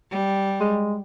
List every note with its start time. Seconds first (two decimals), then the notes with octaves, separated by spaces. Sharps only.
0.11 G3
0.61 G#3